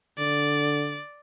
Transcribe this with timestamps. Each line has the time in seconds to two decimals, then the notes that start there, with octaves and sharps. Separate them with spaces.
0.18 D3 D5